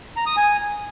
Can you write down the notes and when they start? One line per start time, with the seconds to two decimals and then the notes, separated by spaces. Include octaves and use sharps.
0.16 A#5
0.26 D#6
0.37 G#5